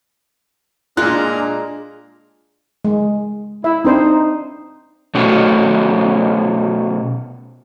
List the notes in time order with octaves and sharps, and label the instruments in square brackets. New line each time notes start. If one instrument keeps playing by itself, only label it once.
[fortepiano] A#2 F#6 [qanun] G#3 F4 [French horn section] D4 [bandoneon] G#4 A#4 A#5
[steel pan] G#3
[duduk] E4 [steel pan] E5
[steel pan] C4 D4 C5 [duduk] D#4
[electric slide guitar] B2 A3 C#4 F#4